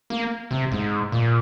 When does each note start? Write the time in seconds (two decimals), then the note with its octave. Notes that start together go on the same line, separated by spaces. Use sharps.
0.10 A#3
0.51 C3
0.72 G#2
1.12 A#2